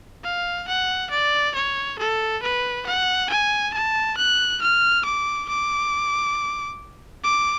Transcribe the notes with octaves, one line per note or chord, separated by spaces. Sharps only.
F5
F#5
D5
C#5
A4
B4
F#5
G#5
A5
F#6
F6
D6
D6
D6